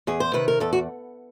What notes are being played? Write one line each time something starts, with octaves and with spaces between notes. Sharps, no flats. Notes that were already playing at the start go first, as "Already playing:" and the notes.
E2 G#4
C5
C3 D#3 B4
A#4
E2 A4
F#4